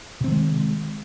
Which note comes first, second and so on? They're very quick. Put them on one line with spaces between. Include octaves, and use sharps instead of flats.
C3 C4 D#3 G#3